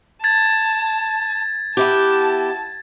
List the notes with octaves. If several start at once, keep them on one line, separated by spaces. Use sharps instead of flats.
A5 G#6 A6
B3 E4 G4 A5